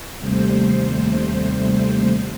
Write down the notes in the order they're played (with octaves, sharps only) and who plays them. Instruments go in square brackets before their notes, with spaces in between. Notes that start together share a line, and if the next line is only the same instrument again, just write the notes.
[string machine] D#2 C3 G3 A3 C5